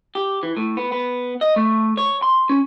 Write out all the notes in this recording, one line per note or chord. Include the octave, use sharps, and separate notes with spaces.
G4
E3
A2
B3
B3
D#5
A3
C#5
C6
C#4